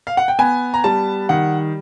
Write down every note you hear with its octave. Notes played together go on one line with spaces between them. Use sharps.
F5
F#5
G5
B3 G#5
A#5
G3 A5
D#3 F#5